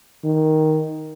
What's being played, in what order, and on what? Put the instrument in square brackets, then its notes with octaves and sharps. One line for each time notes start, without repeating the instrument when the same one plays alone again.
[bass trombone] D#3